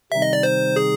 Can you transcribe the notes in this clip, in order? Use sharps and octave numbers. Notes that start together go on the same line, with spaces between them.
C3 D#3 G3 C4 D#4 E5
D#5
D5
C5
G#4